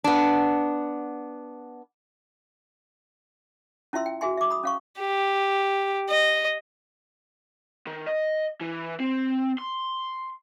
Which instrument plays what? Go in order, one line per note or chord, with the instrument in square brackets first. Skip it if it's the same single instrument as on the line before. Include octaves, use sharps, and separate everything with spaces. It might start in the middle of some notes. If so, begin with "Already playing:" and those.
[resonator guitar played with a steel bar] B3 D4
[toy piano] C#4 E4 F4 E5 C6 E6
G5
F#4 G#4 E5 G#5 C6
E5 D6
B5 D#6
C#4 F5 C#6
[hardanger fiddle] G4
D#5
[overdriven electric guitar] D#3
D#5
E3
C4
C6